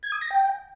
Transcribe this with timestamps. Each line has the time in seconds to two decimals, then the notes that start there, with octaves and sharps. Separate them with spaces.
0.03 G#6
0.12 D#6
0.21 A#6
0.31 G5